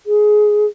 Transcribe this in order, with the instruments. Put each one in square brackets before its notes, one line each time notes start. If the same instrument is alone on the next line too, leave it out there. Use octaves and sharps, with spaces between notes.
[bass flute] G#4